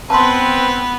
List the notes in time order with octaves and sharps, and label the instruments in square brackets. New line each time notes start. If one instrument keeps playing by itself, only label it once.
[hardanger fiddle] B3 B4 [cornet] C4 [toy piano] A5 C6